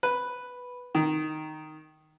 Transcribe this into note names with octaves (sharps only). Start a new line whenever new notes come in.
B4
D#3